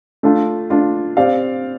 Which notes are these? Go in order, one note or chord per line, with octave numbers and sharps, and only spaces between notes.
A3 D4 F4
A3 D4 F4
C4 G4 D5 F5